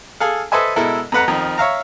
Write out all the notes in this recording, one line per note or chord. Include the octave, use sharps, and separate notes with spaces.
G#4 A4 F5
A4 B4 C5 D#5 E5 G#5
B2 G#3 E4 A4 A#4
F2 A3 B4 F#5 A#5
F2 D#3 F3
C#5 E5 F5 A#5